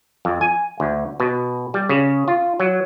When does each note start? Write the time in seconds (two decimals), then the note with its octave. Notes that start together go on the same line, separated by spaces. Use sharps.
0.25 F2
0.41 G#5
0.80 D2
1.20 B2
1.74 G3
1.89 C#3
2.28 F4
2.60 F#3